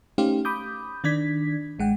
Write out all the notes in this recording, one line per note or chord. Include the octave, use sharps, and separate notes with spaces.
A3 C#4 D#4 G4 C5 F5
B5 D6 D#6 G6
D#3 D4 D5 G#6 B6
A1 G#3 F#5 G5